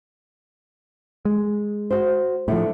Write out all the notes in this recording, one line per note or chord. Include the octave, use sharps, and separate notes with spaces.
G#3
F#4 C5
A2 D3 F3 A3